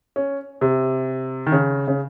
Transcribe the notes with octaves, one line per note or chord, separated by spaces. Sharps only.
C#4
C3
D#3
C#3
C#3